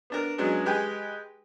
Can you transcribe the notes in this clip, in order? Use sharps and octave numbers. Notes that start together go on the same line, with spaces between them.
B3 D4 A#4
F#3 G#3 B3 C#4 D4
G#3 G4 B4 G5 G#5